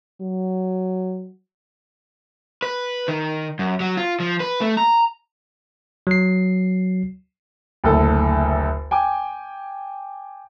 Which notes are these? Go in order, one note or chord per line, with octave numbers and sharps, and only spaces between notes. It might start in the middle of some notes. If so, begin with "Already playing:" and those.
F#3
B4
D#3
F#2
F#3
F4
F3
B4
A3
A#5
F#3 C7
F#1 D2 A4
G5 G#5 D6